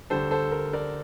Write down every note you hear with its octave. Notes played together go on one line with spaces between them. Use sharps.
D2 D3 G3 A4 C5
A4 C5
A#4
A#4 D5